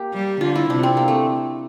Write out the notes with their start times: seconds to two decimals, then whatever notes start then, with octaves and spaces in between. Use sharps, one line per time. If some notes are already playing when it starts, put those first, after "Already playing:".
Already playing: A#3 G4
0.14 G3
0.41 D3 F4
0.55 E4
0.70 C3 D4
0.83 C4
0.97 A#3
1.08 A3